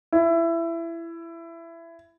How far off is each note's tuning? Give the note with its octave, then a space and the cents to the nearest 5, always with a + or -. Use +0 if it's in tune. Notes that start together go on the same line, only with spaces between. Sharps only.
E4 +20